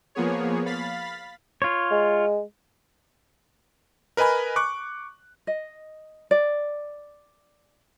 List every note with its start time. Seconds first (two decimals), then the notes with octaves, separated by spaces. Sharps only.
0.15 F3 A#3 B3 G#4 C#5
0.66 F5 B5 A6 B6
1.62 F4 C#5
1.91 G#3
4.17 A#4 B4 D#5 G#5 B5
4.56 C#6 D6 F#6
5.47 D#5
6.31 D5